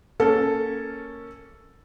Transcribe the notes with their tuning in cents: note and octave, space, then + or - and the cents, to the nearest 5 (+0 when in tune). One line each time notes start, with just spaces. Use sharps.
A#3 -10 C#4 +0 A4 +0